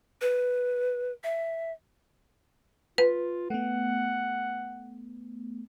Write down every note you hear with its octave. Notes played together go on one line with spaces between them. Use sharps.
B4
E5
F4 B4
A3 B3 F#5